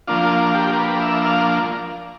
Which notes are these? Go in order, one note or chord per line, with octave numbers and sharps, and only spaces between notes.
F3 A#3 D4 F4
F4
G4
A#4
B4
E5
E5
F5